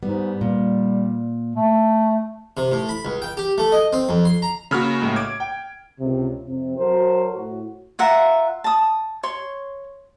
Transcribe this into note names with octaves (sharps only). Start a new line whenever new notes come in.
G#2 G3 B3
A#2 G3
A3
C3
A2
B5
C#2
G5
G4
A3
D#5
C4
F2
C6
A#5
C#3 A#3 F#4 B5 F6
A2 G#3
D6 G#6 D7
G5
C#2 C3
F2 C3
F#3 F#4 A4 A#4 C5
A2 F#4
F4 E5 F#5 A#5
A5 D#6
C#5 C6